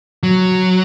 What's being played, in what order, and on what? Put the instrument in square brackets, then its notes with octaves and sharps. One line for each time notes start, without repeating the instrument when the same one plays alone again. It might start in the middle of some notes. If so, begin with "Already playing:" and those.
[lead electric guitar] F#3